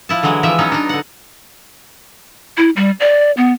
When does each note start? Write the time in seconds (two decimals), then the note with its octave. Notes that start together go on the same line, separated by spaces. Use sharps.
0.09 F3 E4 A5
0.23 D3 E3 F#3 G#3
0.43 E3 F3 E5
0.59 F#3 B3 C#4 D#4
0.72 D4 D#4
0.89 D3 F#5
2.57 E4
2.76 G3
3.00 D5
3.37 B3